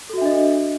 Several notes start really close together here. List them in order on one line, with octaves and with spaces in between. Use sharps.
A4 F#4 E5 D4 D#5